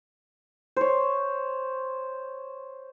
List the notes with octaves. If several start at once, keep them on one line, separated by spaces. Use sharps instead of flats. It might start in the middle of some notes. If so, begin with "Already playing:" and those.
C5 C#5